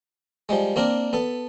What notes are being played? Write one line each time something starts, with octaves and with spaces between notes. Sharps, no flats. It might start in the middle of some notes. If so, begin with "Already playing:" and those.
F3 G3 G#3
A#3 C4 D4 A#4
B3 A4